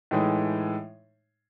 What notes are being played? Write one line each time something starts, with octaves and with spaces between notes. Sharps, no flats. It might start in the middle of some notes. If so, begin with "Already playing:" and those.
A2 E3 G#3 D#4